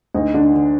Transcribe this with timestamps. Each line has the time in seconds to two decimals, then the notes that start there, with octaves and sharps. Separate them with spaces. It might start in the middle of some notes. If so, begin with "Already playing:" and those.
0.15 D2 D#4
0.34 D3 D4
0.54 D3